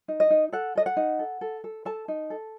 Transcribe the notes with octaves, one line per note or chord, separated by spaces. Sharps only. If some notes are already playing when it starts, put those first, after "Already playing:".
D#4
D#5
D#4
A4 F#5
A4 D#5
F#5
D#4
A4
A4
A4
A4 A5
D#4
A4